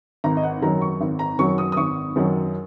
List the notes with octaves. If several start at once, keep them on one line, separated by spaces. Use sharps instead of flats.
G#1 A#5
D#5
F#5
F#2 D#3 F#3 A#5
C#6
G#1
A#5
F#2 D#3 F#3 C#6
D#6
D#6
G#1 C#6
F#2 D#3 F#3